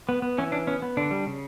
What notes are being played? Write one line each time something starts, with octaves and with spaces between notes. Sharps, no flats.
B3
B3
E3 C#4
C#4 D4
B3 C#4
B3
D3 D4
G3
C#3